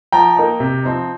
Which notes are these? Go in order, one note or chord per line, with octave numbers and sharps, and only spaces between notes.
F3 G5 A#5
A#3 D#4
C3
F3 C4 D#4